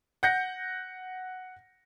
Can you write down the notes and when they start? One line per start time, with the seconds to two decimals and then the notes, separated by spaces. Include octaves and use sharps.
0.23 F#5 G6 A#6 C#7